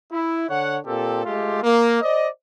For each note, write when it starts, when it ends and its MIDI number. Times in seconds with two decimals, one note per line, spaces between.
0.13 0.46 64
0.49 0.78 50
0.49 0.78 73
0.49 0.78 78
0.86 1.24 46
0.86 1.24 60
0.86 1.24 67
0.86 1.24 69
1.26 1.62 56
1.26 1.62 57
1.26 1.62 65
1.26 1.62 67
1.63 2.00 58
2.01 2.28 72
2.01 2.28 74
2.01 2.28 75